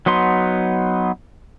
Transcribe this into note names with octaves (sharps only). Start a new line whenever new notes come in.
F#3 B3 D#4 C6